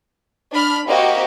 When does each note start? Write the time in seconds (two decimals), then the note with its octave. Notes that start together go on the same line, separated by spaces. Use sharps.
0.52 D4 B5 F6
0.87 A#3 C4 F#4 G4 D#5